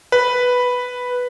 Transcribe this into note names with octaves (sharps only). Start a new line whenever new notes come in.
B4